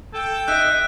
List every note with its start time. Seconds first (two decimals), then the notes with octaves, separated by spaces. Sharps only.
0.13 A4 G5
0.48 D#4 D#5 E5 F#6